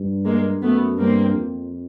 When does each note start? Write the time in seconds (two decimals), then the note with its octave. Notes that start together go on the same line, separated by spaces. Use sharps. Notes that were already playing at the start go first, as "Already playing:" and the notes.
Already playing: G2
0.25 G#3 A#3
0.62 F#2 A3 B3
0.99 G2 A#3 C4
1.36 F2